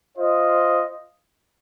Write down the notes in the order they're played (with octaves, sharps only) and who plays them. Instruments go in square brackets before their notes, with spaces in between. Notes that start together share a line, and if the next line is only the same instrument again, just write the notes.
[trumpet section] F4 C5 D#5